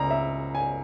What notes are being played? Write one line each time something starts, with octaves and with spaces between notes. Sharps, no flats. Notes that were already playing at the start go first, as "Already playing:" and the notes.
Already playing: C#2 A#5
E5
G#5